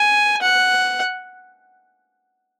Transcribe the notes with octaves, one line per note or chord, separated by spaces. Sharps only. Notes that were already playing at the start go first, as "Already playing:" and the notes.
Already playing: G#5
F#5